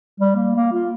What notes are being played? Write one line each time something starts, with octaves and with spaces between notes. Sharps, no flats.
G3
A#3
A#3
F4